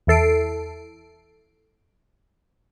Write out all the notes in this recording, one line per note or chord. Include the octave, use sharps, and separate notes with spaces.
E2 E4 A4 C7 D7